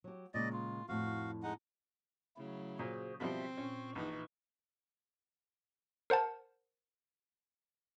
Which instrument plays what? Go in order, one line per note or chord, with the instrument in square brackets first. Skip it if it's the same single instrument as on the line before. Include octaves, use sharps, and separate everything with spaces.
[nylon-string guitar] F#3 G4
[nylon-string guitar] A#2 C#3 G#3 [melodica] D5 D#5
[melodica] F4
[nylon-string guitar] F2 A2 [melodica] F#4 F5
[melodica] G#3 D#4 F#5
[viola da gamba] C#3 F#3 [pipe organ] A3 E4
[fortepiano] A#2 [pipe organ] F#4 G#4 C5
[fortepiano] B2 F3 G3 [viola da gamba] C4 [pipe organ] E5
[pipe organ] A#2 C#6 [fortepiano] C#4
[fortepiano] A#1 [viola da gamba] E3 D#4
[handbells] A#4 C5 F#5 A5